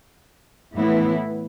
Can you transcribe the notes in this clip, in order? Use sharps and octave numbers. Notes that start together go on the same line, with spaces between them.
A2 E3 B3 E4